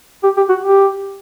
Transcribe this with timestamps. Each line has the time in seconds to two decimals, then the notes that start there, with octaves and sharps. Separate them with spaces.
0.24 G4
0.37 G4
0.49 F#4
0.63 G4